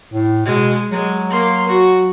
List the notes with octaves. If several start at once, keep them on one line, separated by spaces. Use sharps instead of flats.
A2
B2 G#3
F#3 G#3
A#3 C6
F#4